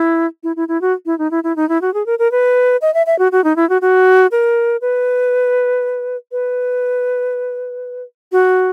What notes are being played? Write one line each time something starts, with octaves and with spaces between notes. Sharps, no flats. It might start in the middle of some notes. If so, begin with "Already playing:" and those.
Already playing: E4
E4
E4
E4
F#4
E4
D#4
E4
E4
D#4
E4
F#4
G#4
A#4
A#4
B4
D#5
E5
E5
F#4
F#4
D#4
E4
F#4
F#4
A#4
B4
B4
F#4